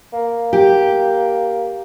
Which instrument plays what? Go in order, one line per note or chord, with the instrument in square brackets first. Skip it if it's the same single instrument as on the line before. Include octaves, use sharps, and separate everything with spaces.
[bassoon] A#3
[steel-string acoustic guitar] G4